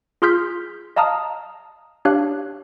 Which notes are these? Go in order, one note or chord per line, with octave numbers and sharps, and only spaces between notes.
F4 G#4 C6 F6 G6 B6
D#5 F5 A5 A#5 D#6 F6
D4 G4 C#5 F5 F#6